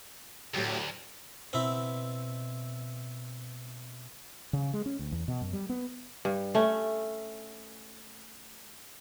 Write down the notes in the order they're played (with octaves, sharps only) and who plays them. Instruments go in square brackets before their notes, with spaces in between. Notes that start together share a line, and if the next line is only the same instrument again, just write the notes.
[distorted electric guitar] D2 [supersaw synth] A2 F#3 G4
[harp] B2 [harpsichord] C4 E4
[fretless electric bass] C#3
G#3
C#4
D2
E2
B2
F#2
G3
B3
[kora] G2
A3 C#4